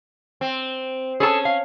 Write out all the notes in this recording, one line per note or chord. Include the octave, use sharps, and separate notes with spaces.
C4
C#4 G#4 A4 A5
F5